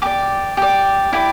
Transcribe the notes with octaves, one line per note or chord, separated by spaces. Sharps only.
G4 D5 D6
G4 D5
E4 G4 D5